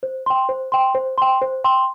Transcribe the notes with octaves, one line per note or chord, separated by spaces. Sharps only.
C5
G5 C6
C5
G5 C6
C5
G5 C6
C5
G5 C6